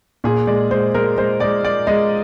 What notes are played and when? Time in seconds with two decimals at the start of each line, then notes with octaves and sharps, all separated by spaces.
0.24 A#2 G#4
0.47 G#3 D5
0.71 G#3 C5
0.94 G#3 A#4
1.18 G#3 C5
1.40 G#3 D5
1.64 G#3 D5
1.87 G#3 D#5